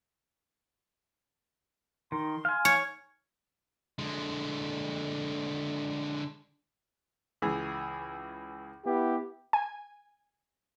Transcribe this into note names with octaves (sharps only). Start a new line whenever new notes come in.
D#3 C6
F5 G#5
C#5
D3 G#3
C#2 E3 G#4
B3 E4 G4
G#5